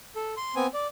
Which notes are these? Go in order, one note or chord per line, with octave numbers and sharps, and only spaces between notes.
A4
C6
B3 C4 G#5
D5